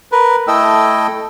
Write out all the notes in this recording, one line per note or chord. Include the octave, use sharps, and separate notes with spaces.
A#4 B4
A3 E4 A4 D#5 G5 E6